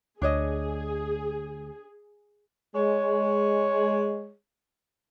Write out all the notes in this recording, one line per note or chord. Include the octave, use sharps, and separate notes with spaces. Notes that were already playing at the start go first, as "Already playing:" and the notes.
D2 D4 G#4 C#5 D#5
G#3 C#5